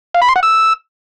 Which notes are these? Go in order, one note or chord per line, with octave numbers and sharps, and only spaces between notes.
F5
B5
C6
F#5
E6